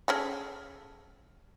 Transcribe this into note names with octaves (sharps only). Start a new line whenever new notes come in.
C#4 G#4 A4